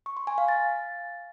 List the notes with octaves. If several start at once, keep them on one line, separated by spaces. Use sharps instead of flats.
C#6
C6
G#5
F5
A6